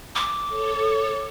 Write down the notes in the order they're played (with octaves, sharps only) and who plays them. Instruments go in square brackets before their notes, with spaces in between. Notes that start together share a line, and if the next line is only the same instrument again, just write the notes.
[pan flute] D6
[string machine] A4 C#5